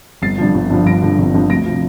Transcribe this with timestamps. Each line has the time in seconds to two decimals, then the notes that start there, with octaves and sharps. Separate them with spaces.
0.22 G1 A6 C7
0.38 G2 D3 F3
0.54 G1
0.70 G2 D3 F3
0.86 G1 A#6 D7
1.02 G2 D3 F3
1.18 G1
1.34 G2 D3 F3
1.50 D2 A#6 D7
1.66 C3 F3